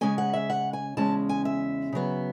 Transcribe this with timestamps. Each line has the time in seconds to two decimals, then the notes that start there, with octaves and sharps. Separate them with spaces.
0.01 C#3 G#3 C#4 G#5
0.18 F#5
0.33 E5
0.50 F#5
0.73 G#5
0.97 E2 C#3 G#3 C#4 A5
1.29 G#5
1.45 E5
1.92 C#3 F#3 B3